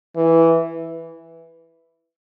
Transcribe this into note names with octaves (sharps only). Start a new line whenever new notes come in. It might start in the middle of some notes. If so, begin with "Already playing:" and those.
E3